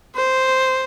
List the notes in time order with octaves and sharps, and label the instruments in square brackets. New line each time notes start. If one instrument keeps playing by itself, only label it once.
[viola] C5